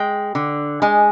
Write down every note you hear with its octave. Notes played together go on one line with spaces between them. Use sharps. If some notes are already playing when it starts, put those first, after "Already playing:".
Already playing: G#3 G5
D3
G#3 G#5